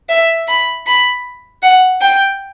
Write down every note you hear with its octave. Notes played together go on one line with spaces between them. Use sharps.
E5
B5
B5
F#5
G5